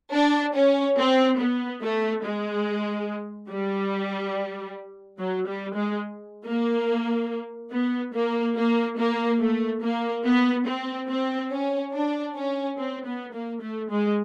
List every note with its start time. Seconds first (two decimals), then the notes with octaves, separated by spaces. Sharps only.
0.13 D4
0.55 C#4
0.98 C4
1.39 B3
1.82 A3
2.24 G#3
3.50 G3
5.19 F#3
5.47 G3
5.75 G#3
6.45 A#3
7.72 B3
8.14 A#3
8.56 A#3
8.98 A#3
9.40 A3
9.82 A#3
10.24 B3
10.66 C4
11.08 C4
11.51 C#4
11.93 D4
12.35 C#4
12.77 C4
13.05 B3
13.33 A#3
13.61 A3
13.90 G#3